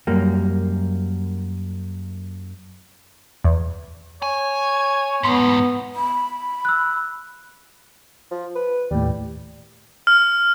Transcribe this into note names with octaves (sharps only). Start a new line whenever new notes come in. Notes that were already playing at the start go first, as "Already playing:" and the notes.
F#2 G3 A#3
E2
C#5 G#5
E2 G#2 B3 B5 C6
B5
E6 F#6
F3
B4
D#2 A2 G3
F6